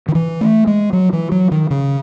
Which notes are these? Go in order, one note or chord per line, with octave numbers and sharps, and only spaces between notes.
D#3
E3
A3
G#3
F#3
E3
F#3
D#3
C#3